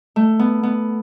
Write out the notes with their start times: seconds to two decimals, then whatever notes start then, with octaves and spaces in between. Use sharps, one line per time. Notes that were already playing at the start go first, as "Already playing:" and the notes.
0.16 A3
0.39 B3
0.63 B3